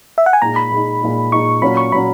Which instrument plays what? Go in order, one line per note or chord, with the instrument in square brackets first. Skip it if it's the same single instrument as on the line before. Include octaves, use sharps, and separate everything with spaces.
[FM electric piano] E5
F#5
G#5
[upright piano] A#2 G#3 D#4 [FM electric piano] A#5
[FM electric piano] B5
[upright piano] A#2 G#3 D#4
A#2 G#3 D#4
[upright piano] A#2 G#3 D#4 [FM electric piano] C#6
[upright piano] A#2 F#3 C#4 [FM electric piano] B5
[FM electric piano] C#6
[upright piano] A#2 F#3 C#4 [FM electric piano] B5